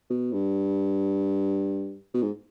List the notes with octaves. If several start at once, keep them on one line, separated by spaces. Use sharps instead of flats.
B2
G2
B2
G#2